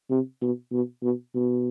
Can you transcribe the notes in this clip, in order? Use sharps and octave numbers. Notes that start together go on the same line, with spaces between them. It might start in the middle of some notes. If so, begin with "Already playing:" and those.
C3
B2
B2
B2
B2